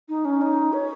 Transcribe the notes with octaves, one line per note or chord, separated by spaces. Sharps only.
D#4
C#4
D#4
C#5